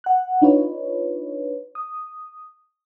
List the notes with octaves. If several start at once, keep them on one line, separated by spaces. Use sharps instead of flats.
F#5 F#6
D4 D#4 F4 B4 C#5
D#6